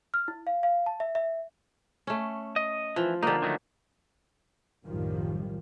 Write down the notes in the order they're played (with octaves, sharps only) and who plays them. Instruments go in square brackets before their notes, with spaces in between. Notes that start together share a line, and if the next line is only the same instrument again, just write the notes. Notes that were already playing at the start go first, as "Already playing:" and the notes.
[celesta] F6
E4
F5
F5
A5
E5
E5
[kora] A3 C#4
[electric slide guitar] D#5
[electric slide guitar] E3 [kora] F3
[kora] D3 A#3 [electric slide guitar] G3 D#4
[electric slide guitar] D#3 F#3 A3
[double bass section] B1 F#2 A2 D#3 F3 G3